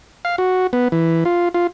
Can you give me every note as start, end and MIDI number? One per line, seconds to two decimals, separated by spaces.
0.25 0.36 77
0.38 0.67 66
0.73 0.88 59
0.92 1.24 52
1.25 1.49 65
1.54 1.67 65